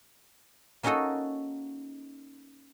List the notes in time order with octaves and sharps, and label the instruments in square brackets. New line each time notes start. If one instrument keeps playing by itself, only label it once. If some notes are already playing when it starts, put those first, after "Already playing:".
[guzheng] A#3 C#4 D#4 F#4 A4 D#5